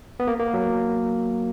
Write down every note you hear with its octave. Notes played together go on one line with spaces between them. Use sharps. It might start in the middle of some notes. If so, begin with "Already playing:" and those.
B3
A#3
A#3
F#3